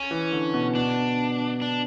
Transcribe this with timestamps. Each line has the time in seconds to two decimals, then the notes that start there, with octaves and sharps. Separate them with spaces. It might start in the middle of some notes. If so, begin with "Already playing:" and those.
Already playing: C#4
0.11 E3
0.32 D3
0.54 B2
0.75 B2 D4
1.62 D4